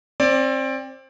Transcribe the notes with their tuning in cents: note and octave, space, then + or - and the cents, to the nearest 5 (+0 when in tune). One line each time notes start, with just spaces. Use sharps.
C4 +25 D5 +0